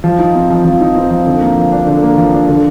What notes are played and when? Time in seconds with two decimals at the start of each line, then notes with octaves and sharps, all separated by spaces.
0.04 F3
0.19 D#4
0.35 C4
0.50 F3
0.65 F3
0.81 D#4
0.95 C4
1.11 F3
1.26 D3
1.41 A#3
1.57 F3
1.72 D4
1.87 D3
2.02 A#3
2.18 F3
2.34 D4
2.48 D3